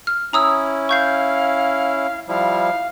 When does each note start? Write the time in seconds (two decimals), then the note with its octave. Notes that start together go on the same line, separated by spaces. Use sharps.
0.07 F6
0.33 C#4 E4 A#5 D#6 E6
0.89 F5 C#6 G6 C7
2.28 F3 G3 E4 F5